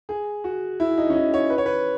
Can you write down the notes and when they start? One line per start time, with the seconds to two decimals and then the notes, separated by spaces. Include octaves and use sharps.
0.09 G#4
0.44 F#4
0.80 E4
0.98 D#4
1.10 C#4
1.15 D#4
1.34 C#5
1.50 B4
1.58 C#5
1.66 B4